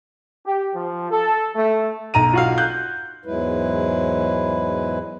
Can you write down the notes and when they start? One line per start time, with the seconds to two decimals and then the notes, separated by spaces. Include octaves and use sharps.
0.45 G4
0.74 F3
1.11 A4
1.55 A3
2.14 B1 A#5 D#7
2.33 F4 F#4 F5
2.58 F#6 G6
3.26 E2 G#2 F#3 G#3 E4 B4